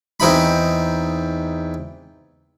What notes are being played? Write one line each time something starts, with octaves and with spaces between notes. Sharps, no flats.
E2 C4 D#4 B5